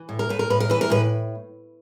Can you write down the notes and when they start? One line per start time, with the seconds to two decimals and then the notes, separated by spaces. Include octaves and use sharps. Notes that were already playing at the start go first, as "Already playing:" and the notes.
Already playing: E3
0.09 A2
0.19 A#4
0.29 A2 B4
0.39 A#4
0.50 A2 B4
0.60 A#4
0.70 E3 B4
0.81 A#4
0.90 A2 B4